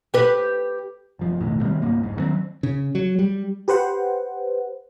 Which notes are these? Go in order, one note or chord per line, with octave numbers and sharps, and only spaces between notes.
G4 B4
F#1 F3
B1 F2 A2 D#3
C3 D#3 G3 A#3
C#2 G#2 A#3
F1 G#2
D#3 F#3 A#3 C4
C#3
F#3
G3
G4 B4 C5 F#5